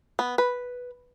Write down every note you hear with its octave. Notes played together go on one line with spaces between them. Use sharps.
B3
B4